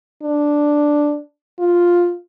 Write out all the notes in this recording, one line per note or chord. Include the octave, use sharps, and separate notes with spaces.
D4
F4